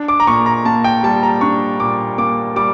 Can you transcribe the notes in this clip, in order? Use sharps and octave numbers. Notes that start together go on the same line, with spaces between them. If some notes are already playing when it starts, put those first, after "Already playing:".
Already playing: D4
D6
A#5
A#2 C#6
A#5
A#3 A5
G5
G3 A5
A#5
D4 C#6
A#2 D6
A#3 D6
G3 D6